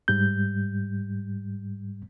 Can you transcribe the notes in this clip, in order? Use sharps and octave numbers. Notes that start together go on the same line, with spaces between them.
G#2 G3 G6